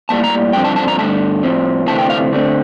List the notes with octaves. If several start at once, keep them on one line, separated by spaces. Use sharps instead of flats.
A2 G3 A#3 A5
A#5
G2 D3 F3 C4 G5
A5
A5
A#5
G2 D3 A3 A5
A2 F3 C4
D2 C3 E3 A3 C4 A5
G5
F5
D2 D3 A3 C4